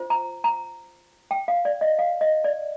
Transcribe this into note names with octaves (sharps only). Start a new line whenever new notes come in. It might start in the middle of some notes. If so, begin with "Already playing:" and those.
Already playing: F4 C5
A#5
A#5
G5
F5
D5
D#5
F5
D#5
D5